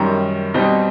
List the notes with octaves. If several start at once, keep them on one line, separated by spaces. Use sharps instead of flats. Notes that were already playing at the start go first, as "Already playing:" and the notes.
Already playing: F#2 D#3 G3 A#5
B2 G3 C4 D#4